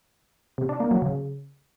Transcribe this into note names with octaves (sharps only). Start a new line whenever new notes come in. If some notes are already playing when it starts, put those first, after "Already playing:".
C3
D4
A#3
F#3
C#3